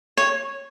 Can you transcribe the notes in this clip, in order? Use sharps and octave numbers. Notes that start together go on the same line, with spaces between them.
C#5